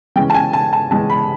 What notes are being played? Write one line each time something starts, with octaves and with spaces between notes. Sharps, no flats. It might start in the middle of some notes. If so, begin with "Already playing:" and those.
C#3 E3 G#3 C#4 G5
A5
G#5
A5
A5
C#3 E3 G#3 C#4 A5
B5